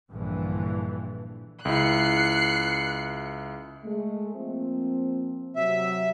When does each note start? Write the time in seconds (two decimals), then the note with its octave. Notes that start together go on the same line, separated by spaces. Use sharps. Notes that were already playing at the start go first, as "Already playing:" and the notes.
0.12 A#1 G2 D3 E3
1.65 C#2 E4 F#6 C7 C#7
3.84 G#3 A3
4.34 F3 A#3 C4
5.56 C3 F#3 E5